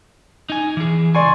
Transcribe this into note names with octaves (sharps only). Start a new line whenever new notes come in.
D#4 G#5
E3 G#4
C#2 D5 G#5 C6 C#6